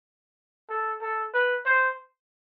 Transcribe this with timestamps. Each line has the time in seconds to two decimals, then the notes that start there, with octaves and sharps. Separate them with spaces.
0.70 A4
1.02 A4
1.34 B4
1.66 C5